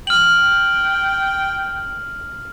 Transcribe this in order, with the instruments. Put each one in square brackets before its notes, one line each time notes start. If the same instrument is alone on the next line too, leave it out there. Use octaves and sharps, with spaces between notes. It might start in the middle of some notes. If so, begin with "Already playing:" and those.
[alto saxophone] G5 [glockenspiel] F6 F#7